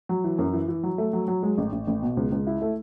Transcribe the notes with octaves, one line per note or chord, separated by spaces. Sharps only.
F#3
E3
F#2
E3
E3
F#3
A3
F#3
F#3
G#3
A1
A1
A1
B2
C#2
C#2
E4
A3